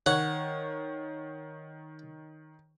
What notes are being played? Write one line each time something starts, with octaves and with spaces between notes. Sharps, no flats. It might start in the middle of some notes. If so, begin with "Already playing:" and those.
D#3 C#5 F#5